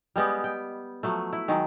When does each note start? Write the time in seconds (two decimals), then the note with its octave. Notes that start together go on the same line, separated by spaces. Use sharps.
0.16 G3 G#3 B3 G4
0.44 G5
1.03 F3 F#3 A3
1.33 E4
1.48 D#3 F#3 G#3